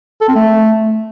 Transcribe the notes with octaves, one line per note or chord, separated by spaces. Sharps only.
A4
C4
A3